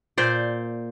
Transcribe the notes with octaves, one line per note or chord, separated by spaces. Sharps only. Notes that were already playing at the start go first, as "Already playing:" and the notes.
A#2 C5 D5